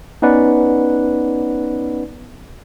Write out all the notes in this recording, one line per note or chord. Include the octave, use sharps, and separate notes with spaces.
B3 C#4 D#4 B4 D5 F#5